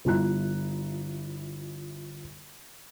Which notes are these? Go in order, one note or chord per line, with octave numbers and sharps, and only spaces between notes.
G1 E4 F4 A#5 F#6